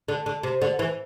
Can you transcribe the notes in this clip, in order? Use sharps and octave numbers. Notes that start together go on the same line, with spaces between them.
D3
D3
C3
D3
E3